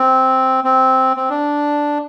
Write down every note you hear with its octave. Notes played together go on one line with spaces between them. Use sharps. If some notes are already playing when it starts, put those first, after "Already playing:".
Already playing: C4
C4
C4
D4